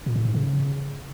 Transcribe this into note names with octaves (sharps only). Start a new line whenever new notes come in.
A#2
A2
G#2
C#3